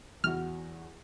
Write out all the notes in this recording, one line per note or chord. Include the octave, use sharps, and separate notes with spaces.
E2 E4 F#4 F6